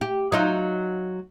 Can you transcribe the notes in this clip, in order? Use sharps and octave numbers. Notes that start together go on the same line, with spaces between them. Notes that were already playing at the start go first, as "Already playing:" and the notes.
G4
F#3 D#4 F4